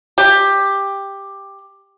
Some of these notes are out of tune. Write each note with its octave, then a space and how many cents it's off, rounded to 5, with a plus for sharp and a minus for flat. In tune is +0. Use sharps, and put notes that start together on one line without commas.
G4 +10